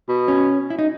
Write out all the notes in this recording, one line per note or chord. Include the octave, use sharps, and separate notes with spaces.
B2
C#4
E4
D#4